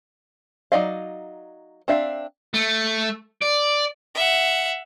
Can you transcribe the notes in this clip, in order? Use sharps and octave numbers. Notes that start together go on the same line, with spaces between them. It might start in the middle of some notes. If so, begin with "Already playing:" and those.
F#3 D#4 D5 D#5 F5
C4 D4 E5 F5
A3
D5
E5 F#5